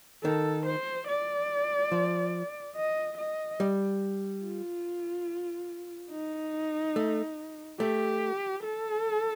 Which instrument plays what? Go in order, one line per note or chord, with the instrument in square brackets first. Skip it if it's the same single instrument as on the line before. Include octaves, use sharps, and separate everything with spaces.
[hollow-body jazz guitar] D#3 [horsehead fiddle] A4
[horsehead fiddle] C5
D5
[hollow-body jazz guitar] F3
[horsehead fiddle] D#5
D#5
[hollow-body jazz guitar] G3
[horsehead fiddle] F4
D#4
[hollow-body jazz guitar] A3
[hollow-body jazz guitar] A3 [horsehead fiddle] G4
[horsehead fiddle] A4